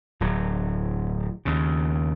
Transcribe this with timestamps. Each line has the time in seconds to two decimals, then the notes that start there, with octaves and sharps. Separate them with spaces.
0.20 D1 F#3
1.45 D#2 C#3